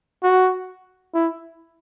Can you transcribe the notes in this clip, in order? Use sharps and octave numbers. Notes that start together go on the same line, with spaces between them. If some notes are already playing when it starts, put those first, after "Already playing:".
F#4
E4